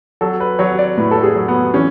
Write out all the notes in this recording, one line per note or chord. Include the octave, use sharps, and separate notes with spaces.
F#3 A4
B4
F#3 C#5
D5
A2 B4
A4
G#4
F#3
B3
E3 C#4